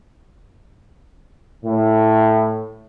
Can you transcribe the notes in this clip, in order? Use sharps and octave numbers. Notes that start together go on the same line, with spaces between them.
A2